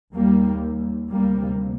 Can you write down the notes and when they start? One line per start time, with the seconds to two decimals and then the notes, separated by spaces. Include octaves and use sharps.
0.14 D#2 G3 A#3
1.11 D2 C3 G3 A#3